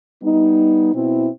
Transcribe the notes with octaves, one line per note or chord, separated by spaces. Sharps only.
G3 B3 D#4
B2 C4 E4